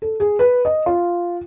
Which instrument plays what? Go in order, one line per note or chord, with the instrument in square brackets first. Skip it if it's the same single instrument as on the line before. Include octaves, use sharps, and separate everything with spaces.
[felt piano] A4
G#4
B4
D#5
F4